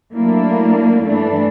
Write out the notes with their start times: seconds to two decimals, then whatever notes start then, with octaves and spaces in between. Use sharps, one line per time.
0.13 F#3 A3 A#3 D4 E4
1.03 G2 E3 A3 D4